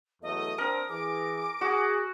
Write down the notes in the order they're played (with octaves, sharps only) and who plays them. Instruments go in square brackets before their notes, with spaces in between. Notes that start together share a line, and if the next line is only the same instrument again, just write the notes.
[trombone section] E2 F#3 A3 [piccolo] D#5
[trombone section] C4 D4 [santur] A#4 [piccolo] D#6
[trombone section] E3 G#4 [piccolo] D6
[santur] F#4 [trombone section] G#4